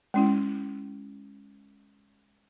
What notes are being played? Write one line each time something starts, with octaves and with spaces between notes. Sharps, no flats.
G#3 C#4 E4